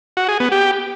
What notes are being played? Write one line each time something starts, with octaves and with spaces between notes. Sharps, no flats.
F#4
G#4
B3
G4